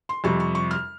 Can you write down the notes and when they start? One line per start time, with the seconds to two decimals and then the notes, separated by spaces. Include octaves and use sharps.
0.09 C6
0.24 F2 C3 G3 C#6
0.40 C#6
0.55 C#6
0.71 F6